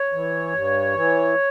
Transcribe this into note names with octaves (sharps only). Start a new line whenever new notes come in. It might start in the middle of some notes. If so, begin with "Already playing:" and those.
Already playing: C#5
E3
G2
E3